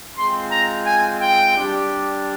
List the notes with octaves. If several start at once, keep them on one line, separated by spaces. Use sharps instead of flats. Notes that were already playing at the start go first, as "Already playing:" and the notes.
G#3 C4 F4 C6
A#5
G#5
G5
G3 D4 G4